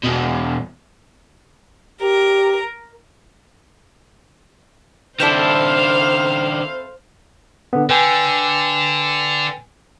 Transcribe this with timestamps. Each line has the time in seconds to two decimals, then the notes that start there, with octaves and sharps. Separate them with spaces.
0.03 E2 B2
2.02 G4 A#4
5.20 D#3 C4 D4 E4 A4 C5 F5
7.73 D3 B3
7.90 D3 B4 G5 G#5